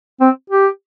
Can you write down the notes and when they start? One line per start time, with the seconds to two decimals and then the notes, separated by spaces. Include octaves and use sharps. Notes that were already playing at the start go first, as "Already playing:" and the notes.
0.21 C4
0.50 G4